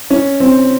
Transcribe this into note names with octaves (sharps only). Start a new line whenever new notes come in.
C#4
C4